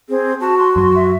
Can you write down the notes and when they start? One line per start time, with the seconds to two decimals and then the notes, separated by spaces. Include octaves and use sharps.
0.09 C4 G#4
0.41 F#4 A5
0.58 C6
0.76 F#2 F#3 C6
0.95 E5